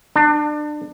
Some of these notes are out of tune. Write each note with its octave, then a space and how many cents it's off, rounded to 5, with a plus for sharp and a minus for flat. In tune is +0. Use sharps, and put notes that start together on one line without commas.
D4 +30